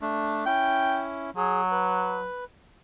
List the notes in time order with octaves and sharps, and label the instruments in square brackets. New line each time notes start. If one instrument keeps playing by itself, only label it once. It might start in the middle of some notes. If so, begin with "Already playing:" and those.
[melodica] A3 D4
[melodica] C#4 E4 [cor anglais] G5
[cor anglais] F#3 [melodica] G#4
[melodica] B4